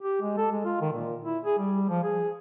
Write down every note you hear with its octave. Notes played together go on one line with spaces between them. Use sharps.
G4
G#3
A4
G#3
F4
D#3
A#2
E4
G#4
G3
F3
G#4